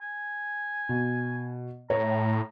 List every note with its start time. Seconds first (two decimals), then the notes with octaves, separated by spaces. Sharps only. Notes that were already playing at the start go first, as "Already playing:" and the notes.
0.01 G#5
0.89 B2
1.90 A2 C#5 A#5